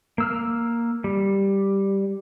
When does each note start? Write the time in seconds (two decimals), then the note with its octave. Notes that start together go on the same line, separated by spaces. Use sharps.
0.18 A#3 E6 F6
1.04 G3